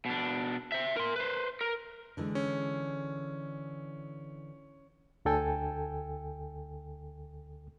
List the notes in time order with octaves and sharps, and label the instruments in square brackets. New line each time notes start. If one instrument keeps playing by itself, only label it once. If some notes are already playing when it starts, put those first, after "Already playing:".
[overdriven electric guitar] B2 D4
C5 E5
A#4 C6
B4 C5
A#4
[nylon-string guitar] D3 E3 G#3
[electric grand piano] C#4
[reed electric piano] D2 D3 A4 G5 G#5